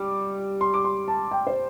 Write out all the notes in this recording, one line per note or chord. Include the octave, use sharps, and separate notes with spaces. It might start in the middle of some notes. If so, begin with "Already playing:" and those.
Already playing: G3 D6
C6
D6
C6
A5
G5
C5